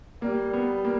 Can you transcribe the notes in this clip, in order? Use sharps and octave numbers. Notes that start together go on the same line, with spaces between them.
G3 A#3
B3
A#3